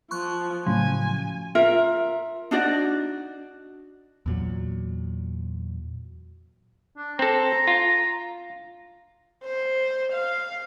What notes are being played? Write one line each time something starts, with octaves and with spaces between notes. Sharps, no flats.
F3 C6 C#6 F#6
A2 C#3 F3 F#3 G#5
F4 A#4 E5
D4 D#4 F#4 D5
E2 A#2 F#3
D4
C4 A4 A#5
F4
C5
F5